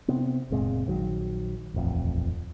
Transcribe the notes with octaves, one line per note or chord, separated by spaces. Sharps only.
C3 B3 C4
F#1 A#2 G#3 C4
A#1 D#3 F#3
D#1 A1 F2